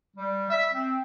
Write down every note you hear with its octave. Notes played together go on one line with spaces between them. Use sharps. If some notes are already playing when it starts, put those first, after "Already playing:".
G3
E5
C4